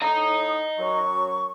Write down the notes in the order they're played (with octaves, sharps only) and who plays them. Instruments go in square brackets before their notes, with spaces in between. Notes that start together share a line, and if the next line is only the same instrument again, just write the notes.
[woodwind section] A2 D#6 [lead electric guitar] D#5 A#5
[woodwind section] F#2 F#3 C#6